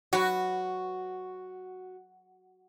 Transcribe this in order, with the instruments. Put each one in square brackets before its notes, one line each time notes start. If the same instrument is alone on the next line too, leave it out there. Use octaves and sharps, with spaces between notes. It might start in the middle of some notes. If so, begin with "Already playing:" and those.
[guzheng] F#3 B4 [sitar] F#4